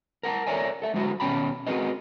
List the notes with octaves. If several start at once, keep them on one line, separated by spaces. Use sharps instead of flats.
A#4 F#5 G#5 A5
A4 A#4 C#5 D5 E5 G#5
A4 E5
D3 F#3 G#3 E4 F#4 C5
D#2 B2 C#4 G5 A5 B5
C4 F#4 G#4 A#4 B4 D#5